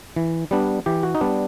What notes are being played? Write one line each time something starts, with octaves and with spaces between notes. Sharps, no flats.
E3
G3 B3 D4
E3 G4
F#4
D#4
G3 B3 D4